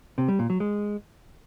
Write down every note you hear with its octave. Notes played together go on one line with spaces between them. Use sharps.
C3
G3
A#2
F#3
G#3